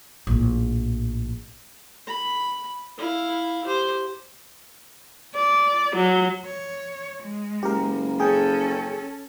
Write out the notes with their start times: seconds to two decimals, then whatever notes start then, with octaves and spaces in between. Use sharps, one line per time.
0.27 A#1 A2
2.07 B5
2.98 E4 F5
3.65 G4 C5
5.35 D5
5.96 F#3
6.45 C#5
7.23 G#3
7.63 F#1 G4 A#4
8.20 C#4 G#4 A4 G5